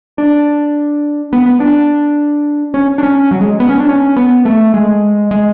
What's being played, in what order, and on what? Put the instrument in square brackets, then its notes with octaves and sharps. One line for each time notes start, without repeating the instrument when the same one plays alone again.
[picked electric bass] D4
B3
B3
D4
C#4
D4
C#4
F#3
G#3
B3
C#4
D4
C#4
B3
A3
G#3
G#3